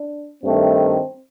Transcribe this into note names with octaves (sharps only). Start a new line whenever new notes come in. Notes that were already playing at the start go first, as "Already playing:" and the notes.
Already playing: D4
G2 D#3 A3 C4